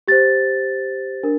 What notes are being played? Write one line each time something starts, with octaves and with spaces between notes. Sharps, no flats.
G4 C5 A6
D4 A#4